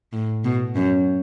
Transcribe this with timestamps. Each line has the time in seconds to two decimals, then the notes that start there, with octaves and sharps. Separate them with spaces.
0.13 A2
0.44 B2
0.76 F#2